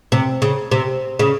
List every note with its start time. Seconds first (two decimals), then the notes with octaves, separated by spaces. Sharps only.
0.12 C3
0.42 C#3
0.71 C3
1.19 C#3